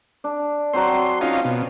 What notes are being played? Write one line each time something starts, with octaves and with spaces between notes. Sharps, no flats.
D4
F#3 C4 C6
C#4 D#4 F4 F5
B2